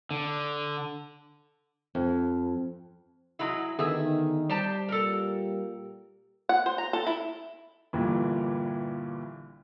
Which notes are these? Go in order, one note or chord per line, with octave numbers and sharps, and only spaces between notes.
D3
F2
F#3 G#3 E4
D3 D#3 B3 G#4 E5
G3 G4 C5 A5
A#2 G4 A4 A#4
F#5
C5
A#5
A4
E4
G1 A#2 E3 G3